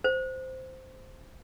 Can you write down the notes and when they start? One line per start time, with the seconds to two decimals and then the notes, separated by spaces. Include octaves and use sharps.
0.04 C5